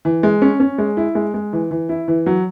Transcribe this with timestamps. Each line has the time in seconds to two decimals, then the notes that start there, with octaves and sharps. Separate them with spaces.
0.05 E3
0.23 G#3
0.42 C#4
0.60 C#4
0.78 G#3
0.97 E4
1.15 G#3
1.34 G#3
1.53 E3
1.71 E3
1.89 E4
2.08 E3
2.26 F#3